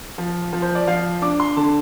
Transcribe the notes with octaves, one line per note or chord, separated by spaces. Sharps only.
F3
F3
C5
D5
F3 F5
D4 D6
C6
D3 A5